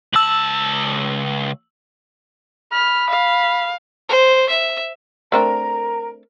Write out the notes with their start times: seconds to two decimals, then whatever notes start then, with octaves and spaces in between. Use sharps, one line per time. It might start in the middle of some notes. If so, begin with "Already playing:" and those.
0.13 C#2 A5 E6 F#7
2.72 B5 F6
3.09 F5
4.09 C5
4.49 E5
5.32 A3 C4 D4 A#4 A#5